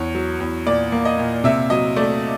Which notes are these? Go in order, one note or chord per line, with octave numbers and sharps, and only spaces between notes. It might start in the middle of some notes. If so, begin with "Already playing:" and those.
Already playing: E2 C#5
F#3
E2
A#2 D5
A#3
D#5
A#2
C3 E5
F#3 D#5
A3 D5